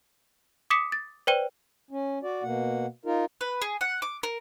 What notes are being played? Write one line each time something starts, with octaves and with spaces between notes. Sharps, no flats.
D6 D#6 B6 C#7 E7
A6
B4 C5 D5 G5 D#7 G7
C#4
F#4 D5
B2 A#3 F#5
D#4 F4 A#4
B4
G#4
F#5
D6
A#4